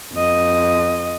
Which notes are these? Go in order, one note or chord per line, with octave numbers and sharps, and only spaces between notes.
F2 D#5